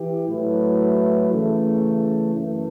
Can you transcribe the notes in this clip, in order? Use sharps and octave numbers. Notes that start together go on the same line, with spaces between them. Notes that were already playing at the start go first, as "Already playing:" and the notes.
Already playing: E3 G4
A2 F#3 A3 E4 B4
C#3 E3 A3
F#2 E3 A3